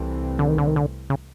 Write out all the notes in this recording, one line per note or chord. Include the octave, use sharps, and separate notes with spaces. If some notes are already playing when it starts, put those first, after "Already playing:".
Already playing: C2 C3 E3 A3 C4
D3
D#3
D3
D#3
D3
C#3